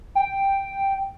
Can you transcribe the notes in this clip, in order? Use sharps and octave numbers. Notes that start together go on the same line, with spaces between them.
G5